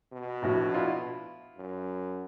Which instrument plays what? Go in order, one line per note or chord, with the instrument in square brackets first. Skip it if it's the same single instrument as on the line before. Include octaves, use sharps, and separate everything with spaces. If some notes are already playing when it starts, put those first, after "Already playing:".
[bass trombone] B2
[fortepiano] A#1 A2 F#4
D4 E4 F4
[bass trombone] F#2